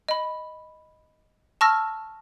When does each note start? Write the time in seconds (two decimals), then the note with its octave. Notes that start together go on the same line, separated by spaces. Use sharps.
0.09 D#5 B5
1.61 A5 C#6 E6 F6 A#6